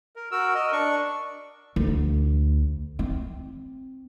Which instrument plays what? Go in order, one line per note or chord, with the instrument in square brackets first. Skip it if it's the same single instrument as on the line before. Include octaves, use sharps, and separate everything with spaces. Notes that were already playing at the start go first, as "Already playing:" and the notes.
[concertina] A#4
F#4 A#4 E6
A#4 D#5
D4 C#6
[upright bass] D2
C4